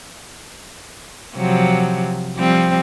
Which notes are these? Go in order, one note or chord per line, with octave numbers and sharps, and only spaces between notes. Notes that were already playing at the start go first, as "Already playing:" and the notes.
C3 F3 F#3
F3 G3 C4